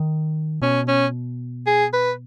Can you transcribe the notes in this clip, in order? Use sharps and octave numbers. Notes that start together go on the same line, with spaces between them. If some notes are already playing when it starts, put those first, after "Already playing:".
Already playing: D#3
B2 C#4
C#4
G#4
B4